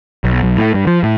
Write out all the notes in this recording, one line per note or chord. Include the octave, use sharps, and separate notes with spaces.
B1
B1
A2
G2
F3
A2